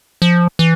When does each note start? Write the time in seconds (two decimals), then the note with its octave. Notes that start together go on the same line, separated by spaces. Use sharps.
0.22 F3
0.59 E3